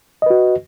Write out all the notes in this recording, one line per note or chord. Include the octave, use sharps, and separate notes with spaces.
F#4 B4 D#5